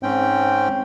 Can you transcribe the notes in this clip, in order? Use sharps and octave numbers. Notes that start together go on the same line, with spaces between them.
G#2 C4 C#4 G5